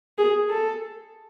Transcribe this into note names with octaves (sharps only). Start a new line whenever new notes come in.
G#4
A4